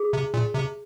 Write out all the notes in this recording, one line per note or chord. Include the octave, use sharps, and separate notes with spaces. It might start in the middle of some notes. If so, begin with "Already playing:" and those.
Already playing: G#4
C3
A#2
C3